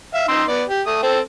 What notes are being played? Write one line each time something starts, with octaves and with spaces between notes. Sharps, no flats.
E5 F5
D#4 C6 E6
B3 D5
G4
A3 D#6
C4 A4 G5